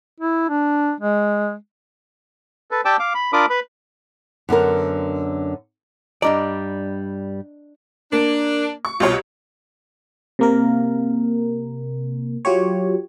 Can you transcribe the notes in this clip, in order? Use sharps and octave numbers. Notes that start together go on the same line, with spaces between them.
E4
D4
G#3
A4 B4
G4 D5 G5 A5 D6 E6
F5 D6
B5
D4 F4 A#4 B5 D6 D#6
B4 B5
F#2 D3 B3 A#4
G2 G3 D4 D5 D#5 A#5
A#3 D4
C#6
C2 B2 F4 C#5
C3 A#3 A#4
F#3 F4 G4 C#5